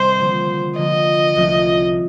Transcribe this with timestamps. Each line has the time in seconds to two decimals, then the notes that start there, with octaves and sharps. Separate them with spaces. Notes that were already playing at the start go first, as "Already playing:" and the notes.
Already playing: C3 D#3 G3 C5
0.19 D3 F3 A#3
0.78 D3 F3 A#3 D#5
1.36 C2 C3 F3 A3 C#4